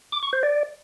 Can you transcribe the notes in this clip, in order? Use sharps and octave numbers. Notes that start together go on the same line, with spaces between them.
D6
C#6
C5
D5